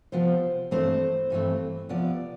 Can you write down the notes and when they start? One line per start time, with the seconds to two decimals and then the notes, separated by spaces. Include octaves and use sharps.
0.12 C3 F3 B3 C5
0.71 G2 E3 A3 C4 C5
1.30 G2 E3 A3 C4
1.89 C3 F3 B3 D5